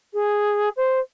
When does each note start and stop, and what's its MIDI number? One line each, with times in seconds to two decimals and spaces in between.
0.14 0.69 68
0.77 1.00 72